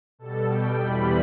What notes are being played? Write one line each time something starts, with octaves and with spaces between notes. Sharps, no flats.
B2 G3 A4
G5
E2 C3 E3 G3 B5